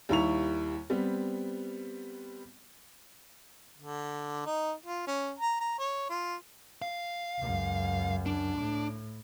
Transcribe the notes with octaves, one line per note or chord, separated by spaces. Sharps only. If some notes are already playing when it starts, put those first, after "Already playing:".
D#2 G3 E4 A#5 C#6 F7
G3 B3 C4
D3
D#4
F4
C#4
A#5
A#5
C#5
F4
F5
C#2 F#2
D4
A2